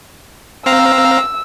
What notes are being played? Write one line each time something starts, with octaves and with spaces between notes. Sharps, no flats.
C4 F5 A#5 E6